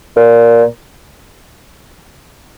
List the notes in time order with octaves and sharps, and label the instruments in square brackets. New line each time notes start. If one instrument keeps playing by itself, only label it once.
[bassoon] A#2